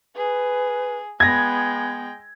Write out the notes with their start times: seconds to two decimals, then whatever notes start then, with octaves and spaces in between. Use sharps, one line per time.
0.16 G#4 B4
1.20 G#3 B3 G5 G#6 A#6